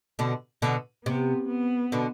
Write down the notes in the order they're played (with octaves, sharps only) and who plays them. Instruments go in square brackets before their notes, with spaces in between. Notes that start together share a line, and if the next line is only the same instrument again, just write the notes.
[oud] B2 D3
B2 D3
[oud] C3 [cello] B3
[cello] B3
[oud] B2 D3